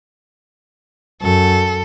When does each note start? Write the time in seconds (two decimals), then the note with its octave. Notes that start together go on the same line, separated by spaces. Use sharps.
1.22 F#2 A4